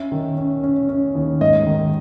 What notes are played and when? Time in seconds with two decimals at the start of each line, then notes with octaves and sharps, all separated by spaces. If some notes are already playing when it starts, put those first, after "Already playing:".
Already playing: C#4 E5
0.12 D#3
0.38 C#4
0.63 C#4
0.89 C#4
1.15 D#2
1.41 G#2 D#5
1.67 D#3